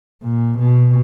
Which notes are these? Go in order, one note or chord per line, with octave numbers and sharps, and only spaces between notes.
A#2
B2